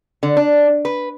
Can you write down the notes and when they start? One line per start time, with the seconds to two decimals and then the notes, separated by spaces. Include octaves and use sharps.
0.23 D3
0.37 D4
0.85 B4